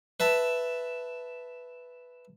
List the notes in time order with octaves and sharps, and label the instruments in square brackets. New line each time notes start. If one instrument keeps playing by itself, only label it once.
[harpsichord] B4 E5 A5